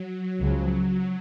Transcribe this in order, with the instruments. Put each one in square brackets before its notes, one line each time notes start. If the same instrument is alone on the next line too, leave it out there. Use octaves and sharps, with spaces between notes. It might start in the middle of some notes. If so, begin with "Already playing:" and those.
Already playing: [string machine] F#3
[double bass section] C#2 C#3 F3